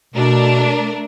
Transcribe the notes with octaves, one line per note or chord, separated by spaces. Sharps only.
B2 A3 D4 A#4